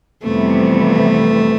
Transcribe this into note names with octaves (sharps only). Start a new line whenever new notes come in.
F2 C3 E3 G3 A3 B3